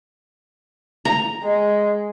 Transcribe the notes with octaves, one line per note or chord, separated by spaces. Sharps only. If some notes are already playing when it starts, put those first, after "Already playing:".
A#5
G#3